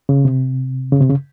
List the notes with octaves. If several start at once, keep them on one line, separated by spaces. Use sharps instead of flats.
C#3
C3
C#3
C3
C#3